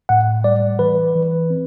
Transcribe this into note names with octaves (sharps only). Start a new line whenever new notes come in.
A2 F#5
G3 D5
E3 B4
E3
C4